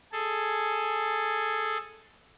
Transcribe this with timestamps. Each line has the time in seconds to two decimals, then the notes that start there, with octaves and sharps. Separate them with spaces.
0.12 G#4 A4